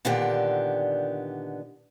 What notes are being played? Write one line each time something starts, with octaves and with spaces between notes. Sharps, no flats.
A#2 D3 D#3 B3 G4 D5